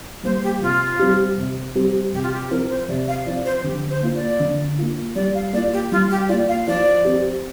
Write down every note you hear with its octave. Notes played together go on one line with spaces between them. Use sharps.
G3 A#3 C5
G4
C3 F4
G3 C4 G4
C3
G3 C4 G4
C3 G4
F4
G4
F3 C4 A#4
C5
C3 D5
F5
F3 C4 D5
C5
D3 G4
C5
A#3 F4
D5
D3
A#3 F4
G3 D5
F5
A#3 F4 D5
G4
G3 F4
G4
A#3 F4 D5
F5
F3 D5
C4 G4